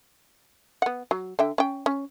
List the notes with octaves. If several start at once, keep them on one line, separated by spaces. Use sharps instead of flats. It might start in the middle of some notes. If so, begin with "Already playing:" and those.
B3 F#5
F#3
D3 E5 G5
C#4 G5
C#4